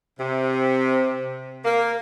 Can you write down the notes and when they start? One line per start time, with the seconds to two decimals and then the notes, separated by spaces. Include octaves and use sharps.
0.19 C3
1.64 A#3